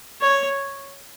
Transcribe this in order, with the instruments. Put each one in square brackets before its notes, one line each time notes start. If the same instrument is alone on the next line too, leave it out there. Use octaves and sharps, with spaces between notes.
[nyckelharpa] C#5